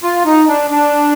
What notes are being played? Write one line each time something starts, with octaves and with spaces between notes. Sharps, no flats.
F4
D#4
D4
D4